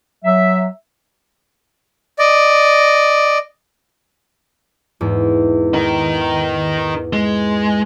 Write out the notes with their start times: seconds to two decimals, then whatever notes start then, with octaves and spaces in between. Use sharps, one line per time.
0.24 F#3 E5
2.19 D5 D#5
5.01 E2 G#2
5.74 D#4 A#4
7.13 G#3